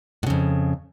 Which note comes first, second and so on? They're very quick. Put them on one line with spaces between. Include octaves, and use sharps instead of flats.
A2 C#3 F2